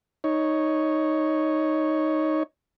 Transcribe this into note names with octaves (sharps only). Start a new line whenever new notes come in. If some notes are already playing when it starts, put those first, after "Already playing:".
D#4 C#5